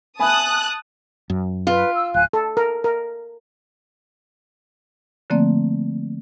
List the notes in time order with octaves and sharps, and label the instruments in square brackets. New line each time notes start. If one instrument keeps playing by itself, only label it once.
[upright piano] E5 G#5 B5 [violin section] A5 D#6 F#6
[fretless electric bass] F#2
[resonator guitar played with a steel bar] F4 [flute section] B4
[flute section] E6
[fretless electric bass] D1 [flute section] F5 G#5 F#6
[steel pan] A4
A#4
A#4
[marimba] D3 F3 A3 A#3 C4 D5